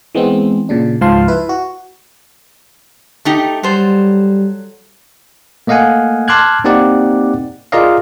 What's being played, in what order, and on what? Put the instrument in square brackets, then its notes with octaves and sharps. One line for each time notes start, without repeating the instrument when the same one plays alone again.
[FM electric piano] E3 G#3 B3 C4
A#2 C#3 D4
C#2 G#2 F3 F5 A5 C6
E4 B4
F#4
[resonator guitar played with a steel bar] A3 D#4 G4
[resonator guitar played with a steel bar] F#3 A4 C5 [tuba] G3
[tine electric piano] A3 A#3 D#5 F5 F#5 G#5
A5 C6 D6 F6 F#6 G#6
A#3 C4 D#4 G4 D5 F#5
F4 G#4 A#4 D5 D#5 F5